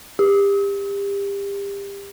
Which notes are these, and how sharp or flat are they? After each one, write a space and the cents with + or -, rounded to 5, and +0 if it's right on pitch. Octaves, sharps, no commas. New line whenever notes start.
G4 +30